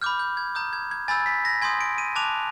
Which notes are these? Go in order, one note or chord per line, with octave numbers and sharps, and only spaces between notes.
B5 D6 F6 G6
G6
G#6
A#5 D#6 G6
G#6
G#6
G#5 B5 E6 G6 A6
B6
A#6
G#5 C6 D#6 G6 G#6
D7
D#7
A5 D6 F#6 F7